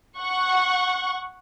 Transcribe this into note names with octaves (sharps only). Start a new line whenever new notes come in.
F#5 C#6